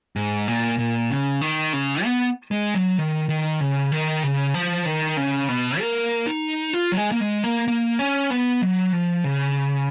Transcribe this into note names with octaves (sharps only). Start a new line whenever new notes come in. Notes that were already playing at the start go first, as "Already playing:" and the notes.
G#2
A#2
A#2
C#3
D#3
C#3
B3
G#3
F#3
D#3
D#3
C#3
D#3
C#3
F3
D#3
C#3
B2
A#3
D#4
F4
F#3
G#3
A#3
G#3
A#3
A#3
C#4
B3
F#3
F3
C#3